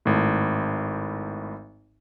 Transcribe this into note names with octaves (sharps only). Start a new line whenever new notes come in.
G#1 A2